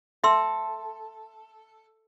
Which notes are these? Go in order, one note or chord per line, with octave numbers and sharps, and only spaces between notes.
A4 E5 C6 E6